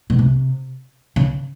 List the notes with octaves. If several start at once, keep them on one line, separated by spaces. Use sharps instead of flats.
B2
C3
C#3